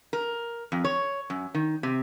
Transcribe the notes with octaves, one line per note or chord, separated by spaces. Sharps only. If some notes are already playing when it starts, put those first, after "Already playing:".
A#4
F2
C#5
F#2
D#3
C3